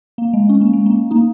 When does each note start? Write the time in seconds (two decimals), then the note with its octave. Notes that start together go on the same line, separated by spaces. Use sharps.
0.18 A#3
0.33 G#3
0.49 C#4
0.61 A#3
0.73 G#3
0.86 A#3
1.11 A#3 D#4